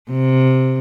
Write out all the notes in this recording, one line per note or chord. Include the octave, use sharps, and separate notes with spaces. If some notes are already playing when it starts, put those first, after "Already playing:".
C3